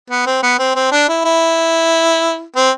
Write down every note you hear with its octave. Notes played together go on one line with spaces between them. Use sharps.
B3
C4
B3
C4
C4
D4
E4
E4
C4